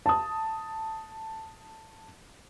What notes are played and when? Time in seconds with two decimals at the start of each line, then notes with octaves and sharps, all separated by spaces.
0.06 A5 D#6